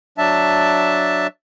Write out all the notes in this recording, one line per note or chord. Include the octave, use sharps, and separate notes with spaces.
F#3 D4 E5 A5